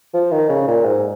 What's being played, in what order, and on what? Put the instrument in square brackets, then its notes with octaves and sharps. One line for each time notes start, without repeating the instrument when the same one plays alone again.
[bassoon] F3
D#3
C#3
A#2
G#2